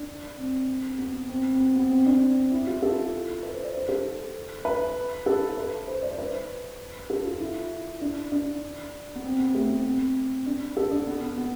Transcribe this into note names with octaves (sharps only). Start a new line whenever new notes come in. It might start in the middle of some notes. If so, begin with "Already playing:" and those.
Already playing: D4
C4
B3
C4
C4
B3
B3
C4
D4
E4
F4
A4
B4
C5
D5
C5
A4
B4
A4
B4
C5
D5
C5
B4
A4
F4
E4
D4
D4
B3
C4
B3
A3
B3
C4
D4
A4
D4
B3
B3
B3